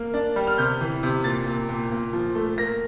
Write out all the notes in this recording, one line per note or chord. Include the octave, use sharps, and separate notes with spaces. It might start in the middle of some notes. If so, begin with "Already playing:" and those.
Already playing: A#3
D4
G3
F6
C3 G6
E3
C3
A#2 A6
A#2
A#2
A#2
F3
A3
A#3 A#6